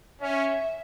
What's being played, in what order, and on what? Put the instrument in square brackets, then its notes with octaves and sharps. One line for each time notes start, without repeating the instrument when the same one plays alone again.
[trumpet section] C#4 [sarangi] E5